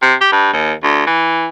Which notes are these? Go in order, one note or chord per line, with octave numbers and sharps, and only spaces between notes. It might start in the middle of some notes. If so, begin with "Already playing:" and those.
C3
G4
G2
D#2
D2
E3